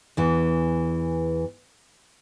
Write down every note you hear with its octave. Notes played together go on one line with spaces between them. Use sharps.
E2 E3